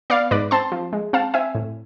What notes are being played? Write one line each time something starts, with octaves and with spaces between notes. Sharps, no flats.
B3 D5 F5
G#2 B4 D5
C4 A5 C6
F3
G#3
C4 F5 A5
C4 E5 G#5
A2